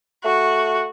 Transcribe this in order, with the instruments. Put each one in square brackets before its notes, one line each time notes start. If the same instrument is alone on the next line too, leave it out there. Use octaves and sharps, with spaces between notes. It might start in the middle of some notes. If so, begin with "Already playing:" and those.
[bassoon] A3 [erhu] F#4